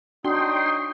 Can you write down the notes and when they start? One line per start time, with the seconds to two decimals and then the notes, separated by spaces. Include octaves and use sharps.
0.24 D4 D#4 F#4 C#5 G5 C6 D#6